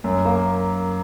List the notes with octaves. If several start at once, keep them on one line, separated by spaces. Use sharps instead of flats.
F#2
A#3